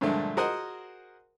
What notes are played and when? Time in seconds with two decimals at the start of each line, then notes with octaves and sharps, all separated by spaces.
0.01 G2 A#2 D3 F3 G#3 A3
0.37 F#4 G#4 A#4 C5 D#5 F#5